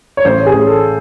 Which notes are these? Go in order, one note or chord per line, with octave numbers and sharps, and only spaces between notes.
C#5
A1 C5
G#4
A1
A4